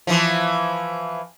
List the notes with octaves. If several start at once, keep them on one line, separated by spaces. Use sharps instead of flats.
E3 F3